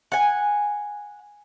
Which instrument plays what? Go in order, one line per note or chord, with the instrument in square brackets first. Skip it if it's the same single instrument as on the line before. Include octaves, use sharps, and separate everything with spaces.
[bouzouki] F#5 G#5